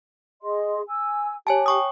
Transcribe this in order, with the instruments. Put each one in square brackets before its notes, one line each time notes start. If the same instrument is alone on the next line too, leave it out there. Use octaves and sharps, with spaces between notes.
[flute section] G#4 D#5 C6
G#5 E6
[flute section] G4 [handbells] C#5 G#5 A5
[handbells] G5 C#6 D#6